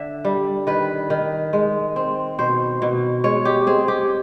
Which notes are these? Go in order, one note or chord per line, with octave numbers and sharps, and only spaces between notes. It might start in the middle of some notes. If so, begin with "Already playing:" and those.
Already playing: D3 E5
G3
D#3 B4
D#3
G#3
C4
B2 C5
B2
G#3 C#5
G4
C4 G#4
G4